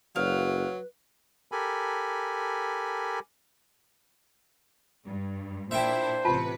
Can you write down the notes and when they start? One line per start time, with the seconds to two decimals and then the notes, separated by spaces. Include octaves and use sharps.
0.16 F#1 F#3 B4 F5
1.52 G4 A4 A#4 G#5 B5
5.06 G2
5.71 A#2 D4 E4 C5 E5 G5
6.25 A1 C3 F4 B4 A5